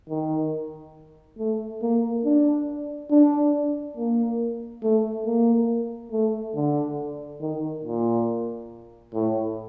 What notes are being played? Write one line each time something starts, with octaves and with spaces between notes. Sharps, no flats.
D#3
A3
A#3
D4
D4
A#3
A3
A#3
A3
D3
D#3
A#2
A2